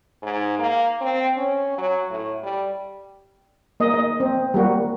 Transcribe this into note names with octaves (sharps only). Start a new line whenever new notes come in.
G#2
A#3
C4
C#4
F#3
A2
G3
A#3 D#5
D#5
C4
G3 A#3 F#4